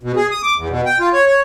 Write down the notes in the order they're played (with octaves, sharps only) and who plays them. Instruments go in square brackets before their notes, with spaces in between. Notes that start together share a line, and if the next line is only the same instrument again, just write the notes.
[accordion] B2
G#4
D#6
D6
E2
B2
G5
F4
C#5
C#5